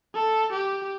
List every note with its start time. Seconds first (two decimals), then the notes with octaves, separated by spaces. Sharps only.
0.15 A4
0.53 G4